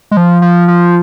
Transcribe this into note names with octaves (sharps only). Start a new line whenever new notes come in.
G#3
F3
F3
F3